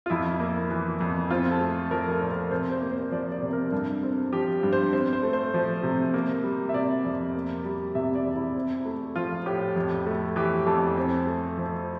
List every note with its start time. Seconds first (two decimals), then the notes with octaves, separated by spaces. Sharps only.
0.06 F4
0.10 F2 E4
0.40 A#3
0.70 E3
1.01 F2
1.30 C4 F4
1.51 A4
1.61 A3
1.91 F3 A#4
2.11 A4
2.21 A#2
2.31 A#4
2.51 C3 C5
2.72 C5
2.82 A#3
2.92 C5
3.12 F3 D5
3.32 D5
3.42 C3
3.53 A#4
3.72 G2 A4
4.03 C4
4.33 F3 G4
4.63 G2
4.73 C5
4.93 C4 C5
5.13 C5
5.23 A3
5.33 C5
5.54 F3
5.83 C3
6.14 A#3
6.44 G3
6.69 E5
6.74 C3 D5
7.05 F2
7.35 A#3
7.65 G3
7.95 C3 E5
8.15 D5
8.25 E2
8.35 E4
8.55 C4
8.86 A3
9.16 F3 F4
9.46 A2 G4
9.76 F2
10.06 A3
10.36 E3 G4
10.66 F2 A4
10.97 C4
11.27 A3
11.57 F3